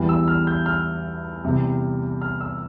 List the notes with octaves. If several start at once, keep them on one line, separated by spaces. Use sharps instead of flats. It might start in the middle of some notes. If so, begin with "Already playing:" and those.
Already playing: E2 E3 G3
E6
F6
G6
F6
E2 C3 G3
F6
E6